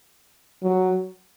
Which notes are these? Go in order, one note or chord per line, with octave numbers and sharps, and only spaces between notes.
F#3